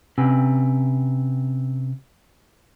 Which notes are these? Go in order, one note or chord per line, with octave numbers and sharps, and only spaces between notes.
C3 C4 C#4 B4 F#5 G#5